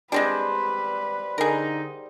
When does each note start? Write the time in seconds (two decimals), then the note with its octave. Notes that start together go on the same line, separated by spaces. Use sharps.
0.12 G3 G#3 C4 D4 B4 C5 C6
1.38 D3 D#4 G#4 A#4